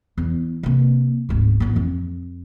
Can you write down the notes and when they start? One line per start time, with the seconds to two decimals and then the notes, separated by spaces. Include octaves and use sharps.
0.18 E2
0.63 C3 A#3
1.29 D1 G#1
1.60 A1 D#2
1.76 F2